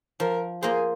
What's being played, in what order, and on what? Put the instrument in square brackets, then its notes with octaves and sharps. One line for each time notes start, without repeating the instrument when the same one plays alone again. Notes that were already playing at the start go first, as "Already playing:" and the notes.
[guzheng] F3 [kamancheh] A#4
[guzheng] A#3 F4 C5 [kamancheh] G#4